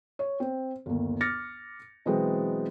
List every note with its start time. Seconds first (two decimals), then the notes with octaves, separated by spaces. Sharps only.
0.19 C#5
0.40 C4
0.86 G1 D#2
1.21 D6 F6 A6 A#6 C#7
2.06 B2 E3 F#3 G#3 B3 C4